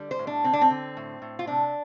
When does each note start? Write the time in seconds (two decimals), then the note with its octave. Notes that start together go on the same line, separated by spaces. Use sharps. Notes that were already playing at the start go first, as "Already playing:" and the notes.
Already playing: D3 G3
0.11 C5
0.19 A2
0.27 D4
0.44 D3 C4
0.53 D4
0.61 C4
0.70 D3
0.97 A2
1.22 A2
1.39 F4
1.47 C3 D4